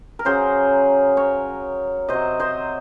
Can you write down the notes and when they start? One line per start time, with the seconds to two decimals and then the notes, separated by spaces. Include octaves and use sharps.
0.19 A#4
0.25 C#3 F#3 G#4 C5
1.17 A#4 C#5
2.08 C3 F#3 C5 D#5
2.40 C5 D#5